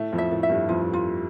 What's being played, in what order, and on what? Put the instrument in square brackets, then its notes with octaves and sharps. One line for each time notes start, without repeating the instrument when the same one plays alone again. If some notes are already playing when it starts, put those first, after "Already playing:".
Already playing: [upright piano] A2 A3
F2 F3
[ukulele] E5
[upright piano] A2 A3
[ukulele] E5
[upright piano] G2 G3
[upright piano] F2 F3 [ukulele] F4
[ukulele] F4